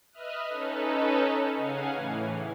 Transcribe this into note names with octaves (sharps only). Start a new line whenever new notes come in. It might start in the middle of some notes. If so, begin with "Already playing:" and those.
B4 D#5 E5 D#6 F6 F#6
C#4 D#4 A4 B4
C#3 F5 F#5 G#5
A2 E3